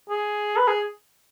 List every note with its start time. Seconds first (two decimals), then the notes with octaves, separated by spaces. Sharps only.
0.10 G#4
0.57 B4
0.68 G#4